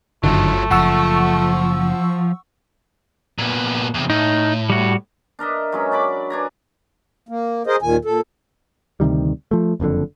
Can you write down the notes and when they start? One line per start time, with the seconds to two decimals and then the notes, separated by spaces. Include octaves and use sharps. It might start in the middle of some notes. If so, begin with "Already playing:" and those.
0.24 G1 F#2 D3 D#3 F3 F#3 A3
0.71 F#1 F3 F#5 C#6 E6
3.38 A#2 B3
3.94 E2 C3
4.10 A2 D#4
4.70 G3 F#4
5.39 D4 A#4 D#5 E5
5.72 F#3 G#3 C#4
5.91 D4 D5 B5 D6
6.30 D4 G#5 A#5
7.29 A#3
7.67 G#4 A#4 C5 D#5
7.82 D#2 A#2 D#3 G#5
8.05 A#2 A4
9.00 D2 C3 D#3 G3
9.51 F3 A3
9.80 F#1 F2 A2 D3